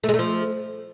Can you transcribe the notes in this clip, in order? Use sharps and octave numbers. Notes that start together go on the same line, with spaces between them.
A3
G#3
A3
F3